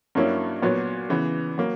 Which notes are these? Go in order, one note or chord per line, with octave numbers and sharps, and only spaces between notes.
G2 F#3 A#3 C#4 E4
A#2 F#3 B3 F#4
C#3 E3 B3
F#3 A#3